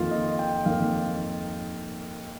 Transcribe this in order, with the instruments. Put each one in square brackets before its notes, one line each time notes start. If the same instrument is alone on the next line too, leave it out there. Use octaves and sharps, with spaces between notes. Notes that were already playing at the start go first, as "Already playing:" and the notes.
Already playing: [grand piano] F2 D#3 A#3 F4
D#5
G5
F2 D#3 A#3 F5